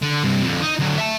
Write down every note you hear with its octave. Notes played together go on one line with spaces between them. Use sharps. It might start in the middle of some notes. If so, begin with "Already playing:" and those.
D3
G2 C3
F2 D3
D#4
D2 F#3
E5 A5